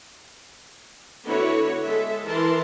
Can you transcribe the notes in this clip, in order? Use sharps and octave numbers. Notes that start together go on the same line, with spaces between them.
D3 B3 E4 F#4 C#5
G#3 A4 E5
E3 E4 A#4 A5 C6